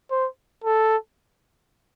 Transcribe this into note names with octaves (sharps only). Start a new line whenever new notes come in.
C5
A4